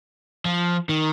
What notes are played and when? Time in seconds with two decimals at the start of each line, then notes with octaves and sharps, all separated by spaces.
0.45 F3
0.89 D#3